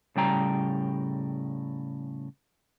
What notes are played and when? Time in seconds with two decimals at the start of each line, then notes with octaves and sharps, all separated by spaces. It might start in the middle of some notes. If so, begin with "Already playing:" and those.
0.16 A2 C#3 G3 G5 A#5